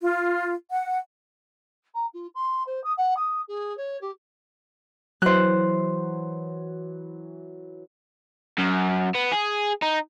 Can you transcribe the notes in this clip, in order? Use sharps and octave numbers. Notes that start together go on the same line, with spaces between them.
F4
F#5
A#5
F4
C6
C5
D#6
F#5
D#6
G#4
C#5
G4
E3 F#3 C5 F#6
F#2
B3
G#4
D#4